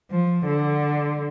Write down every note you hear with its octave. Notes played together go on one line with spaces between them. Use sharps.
F3
D3